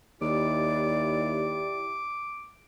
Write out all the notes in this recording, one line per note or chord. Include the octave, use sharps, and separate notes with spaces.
D#2 E4 G4 D5 D6